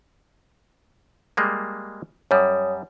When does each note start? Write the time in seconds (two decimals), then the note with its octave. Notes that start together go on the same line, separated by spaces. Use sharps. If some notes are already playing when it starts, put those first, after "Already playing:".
1.37 G3 G#3 A#3
2.31 F#2 G3 C#5 D#6